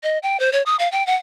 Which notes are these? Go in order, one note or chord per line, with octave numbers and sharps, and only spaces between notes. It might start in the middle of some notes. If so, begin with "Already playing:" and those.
D#5
G5
C5
C#5
D#6
F5
G5
F#5